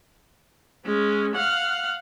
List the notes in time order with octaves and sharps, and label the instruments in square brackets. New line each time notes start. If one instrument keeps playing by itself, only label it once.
[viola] G#3 C#4
F5 F#5